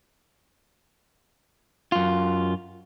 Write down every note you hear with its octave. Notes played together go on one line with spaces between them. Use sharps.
F#2 F4